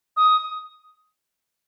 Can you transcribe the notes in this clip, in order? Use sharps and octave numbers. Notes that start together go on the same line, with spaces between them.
D#6